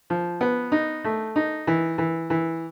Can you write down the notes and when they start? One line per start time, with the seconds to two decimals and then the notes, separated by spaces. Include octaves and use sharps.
0.10 F3
0.41 B3
0.72 D#4
1.04 A3
1.36 D#4
1.67 E3
1.98 E3
2.30 E3